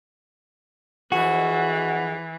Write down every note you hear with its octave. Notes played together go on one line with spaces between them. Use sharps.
F2 E3 F#4 G#4 F#5